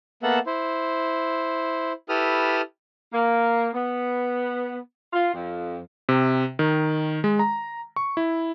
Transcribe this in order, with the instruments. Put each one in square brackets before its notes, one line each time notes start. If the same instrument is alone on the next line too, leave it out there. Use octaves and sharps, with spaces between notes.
[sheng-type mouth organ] A#3 B3 A4 E5 F#5
E4 C5
E4 G4 A4 B4 D#6 F6
[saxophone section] A#3
B3
F4
F2
[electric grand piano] C3
D#3
G#3
A#5
C#6
E4